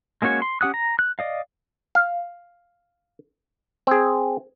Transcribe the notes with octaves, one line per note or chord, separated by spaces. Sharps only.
G#3 A#3 C#4 F#4 C#5
C6
C#4 G4 F#5 D#6 F#6
A#5
F#6
D5 D#5 F5
F5
C4 G#4